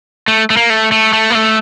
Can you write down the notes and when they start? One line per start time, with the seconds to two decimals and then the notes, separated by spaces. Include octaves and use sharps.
0.28 A3
0.50 A3
0.57 A#3
0.70 A3
0.92 A3
1.13 A3
1.30 A#3
1.35 A3